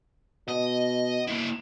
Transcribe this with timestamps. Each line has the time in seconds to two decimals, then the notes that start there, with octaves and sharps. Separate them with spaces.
0.48 B2 D#5
1.28 A#3 E4